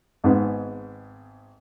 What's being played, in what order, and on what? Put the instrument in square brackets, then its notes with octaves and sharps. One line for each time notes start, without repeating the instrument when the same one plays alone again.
[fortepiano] G#1 G#2 G#3 B3